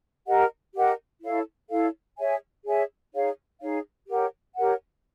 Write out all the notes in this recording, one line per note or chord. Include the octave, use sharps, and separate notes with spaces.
G4 A#4 D#5 F#5
G4 A#4 D#5 F#5
E4 A4 C#5 F5
E4 A4 C#5 F5
G#4 C#5 E5 G#5
G#4 C#5 E5 G#5
D#4 G#4 C#5 F5
D#4 G#4 C#5 F5
G4 A#4 C#5 F#5
G4 A#4 C#5 F#5